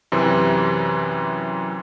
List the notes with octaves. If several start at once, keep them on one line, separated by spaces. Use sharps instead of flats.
F#2 C3 E3